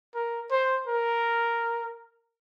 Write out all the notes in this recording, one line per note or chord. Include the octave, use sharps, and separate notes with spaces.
A#4
C5
A#4